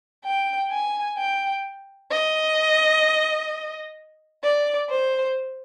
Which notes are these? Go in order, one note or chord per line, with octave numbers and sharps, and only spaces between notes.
G5
G#5
G5
D#5
D5
C5